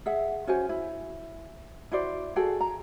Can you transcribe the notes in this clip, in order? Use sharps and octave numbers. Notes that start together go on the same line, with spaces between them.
G#4 E5 F#5
C#4 F#4 C5 G#5
E4
E4 F#4 C5 D5
F#4 G#4 A4 G5
A#5